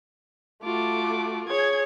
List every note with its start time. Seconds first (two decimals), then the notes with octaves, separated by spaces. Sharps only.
0.63 A3 F4 F#4 D6
1.48 G#4 C#5 G#6